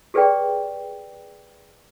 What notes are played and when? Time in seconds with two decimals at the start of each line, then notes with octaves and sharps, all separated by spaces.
0.14 G4 G#4 B4 D5 G5